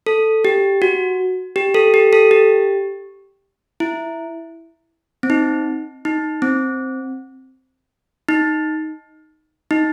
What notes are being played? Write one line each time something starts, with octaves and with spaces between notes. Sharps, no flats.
A4
G4
F#4
G4
A4
G4
A4
G4
E4
C4
D#4
D#4
C4
D#4
D#4